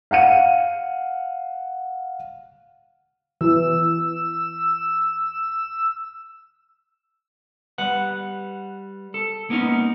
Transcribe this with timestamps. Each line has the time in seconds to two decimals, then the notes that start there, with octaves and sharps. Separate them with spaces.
0.11 F5 F#5 C#7 D#7
3.41 E3 E6
7.78 G3 B4 F#5
9.14 A4
9.50 A#3 B3 C#4 D#4